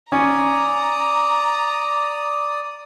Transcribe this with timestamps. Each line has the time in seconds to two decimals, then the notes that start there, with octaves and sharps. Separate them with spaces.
0.12 C#4 D5 A#5 D#6